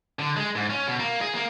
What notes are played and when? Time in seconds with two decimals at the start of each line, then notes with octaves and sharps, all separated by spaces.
0.19 D3
0.36 G#3
0.55 G#2
0.70 C#4
0.87 B2
1.00 A#3
1.21 G#4
1.35 A#3